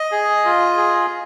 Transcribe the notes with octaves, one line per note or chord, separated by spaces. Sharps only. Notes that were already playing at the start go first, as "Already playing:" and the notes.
Already playing: D#5
G#4
F4
G#4